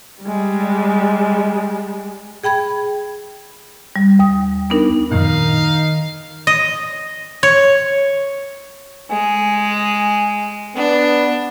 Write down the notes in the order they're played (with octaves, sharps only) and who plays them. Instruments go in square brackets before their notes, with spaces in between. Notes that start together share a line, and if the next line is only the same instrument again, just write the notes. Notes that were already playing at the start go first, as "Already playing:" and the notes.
[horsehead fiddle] G3 G#3
[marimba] G#4 G5 B5 G#6
G3
D#2 D#6
B3 D4 D#4 A#4
[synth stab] F#2 A#2 [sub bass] D#3 [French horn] D#4 [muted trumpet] F5
[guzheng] D#5
C#5
[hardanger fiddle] G#3 [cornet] G#5
[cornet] B3 [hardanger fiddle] D4